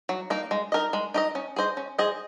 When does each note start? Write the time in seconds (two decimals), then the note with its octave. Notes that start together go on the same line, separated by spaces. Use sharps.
0.09 F#3
0.30 A#3 D#4
0.51 G#3
0.72 D#4 A#4 D#5
0.93 G#3
1.14 D#4 A#4 D#5
1.35 C#4
1.56 G#4 C5 D#5
1.77 C#4
1.98 G#4 C5 D#5